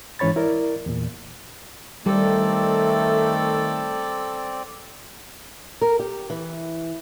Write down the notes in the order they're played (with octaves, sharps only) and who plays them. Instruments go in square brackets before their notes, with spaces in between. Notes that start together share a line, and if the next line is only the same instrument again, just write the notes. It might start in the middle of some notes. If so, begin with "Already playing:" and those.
[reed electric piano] G#2 E3 C#4 C#5 B5 A6
E4 A#4 D5
E2 A#2
[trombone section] D#3 A3 [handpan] G3 [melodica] C4 D5 [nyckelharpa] A4
[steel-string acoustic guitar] A#4
G4
E3